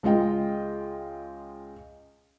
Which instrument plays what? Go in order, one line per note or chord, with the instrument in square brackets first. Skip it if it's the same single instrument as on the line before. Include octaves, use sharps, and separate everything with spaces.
[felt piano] C#2 G#3 F4 D#5 G5